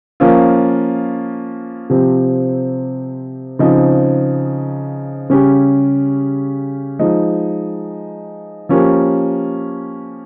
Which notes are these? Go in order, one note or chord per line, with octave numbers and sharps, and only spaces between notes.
F3 A#3 C#4 F4
C3 F3 C4 G4
C#3 F3 C4 D#4
C#3 G3 C#4 G4
F3 G#3 D#4
F3 A#3 C#4 G4